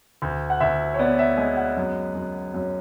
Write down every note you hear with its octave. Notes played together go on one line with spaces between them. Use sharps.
D2
F#5
D2 E5
C#5
B3 D5
E5
G#3 G#5
F#5
F#2
F#2
F#2